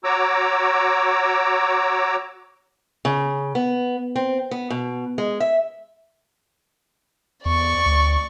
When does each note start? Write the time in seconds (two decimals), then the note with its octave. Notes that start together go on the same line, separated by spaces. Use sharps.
0.04 F#4 C#5 A#5 D6 E6
3.05 C#3
3.55 B3
4.16 C4
4.51 B3
4.70 B2
5.18 G#3
5.40 E5
7.46 E2 D5 C#6
7.86 D2